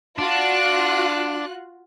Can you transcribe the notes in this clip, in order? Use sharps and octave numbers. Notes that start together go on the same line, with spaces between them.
D4 F4 F#4 F#6